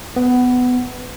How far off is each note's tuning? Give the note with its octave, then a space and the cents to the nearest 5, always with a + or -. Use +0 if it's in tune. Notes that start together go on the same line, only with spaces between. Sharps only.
B3 +15